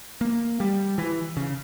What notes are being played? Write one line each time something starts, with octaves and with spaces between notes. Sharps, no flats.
A#3
G3
E3
C#3